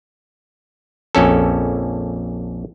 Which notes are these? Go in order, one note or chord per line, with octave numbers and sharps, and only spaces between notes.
A#1 F2 C#4 A4